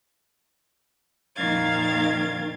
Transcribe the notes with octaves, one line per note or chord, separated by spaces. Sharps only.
F2 A#2 D#3 F5 G#6 A6